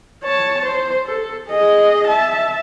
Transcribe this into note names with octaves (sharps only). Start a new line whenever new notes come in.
C#5 A5
C5
A4
G#4 D#5
E5 A5